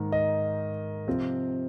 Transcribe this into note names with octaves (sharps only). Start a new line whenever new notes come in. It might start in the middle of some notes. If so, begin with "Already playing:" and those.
Already playing: G#2 D#3 A#3 D#4
D#5
C3 F3 C4 F4